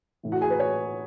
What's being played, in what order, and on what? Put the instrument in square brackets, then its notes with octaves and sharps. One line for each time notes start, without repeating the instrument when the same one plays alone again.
[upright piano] A2 E3
F#4 F#5
G#4 G#5
B4
C#5